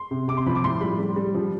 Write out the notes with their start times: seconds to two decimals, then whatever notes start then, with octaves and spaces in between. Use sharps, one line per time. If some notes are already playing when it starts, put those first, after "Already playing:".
Already playing: C6
0.11 C3
0.28 C3 D6
0.37 C6
0.46 F3 B5
0.55 D6
0.64 A2 C6
0.81 G3 B5
0.99 G3
1.16 G3
1.34 F3